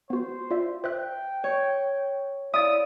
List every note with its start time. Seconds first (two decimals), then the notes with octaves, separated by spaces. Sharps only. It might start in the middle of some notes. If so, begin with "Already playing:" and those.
0.10 B3 F#4 C5
0.51 F4 D5 E5
0.84 C5 E5 G5 F#6
1.44 C#5
2.54 E4 D5 E5 F5 D#6 A6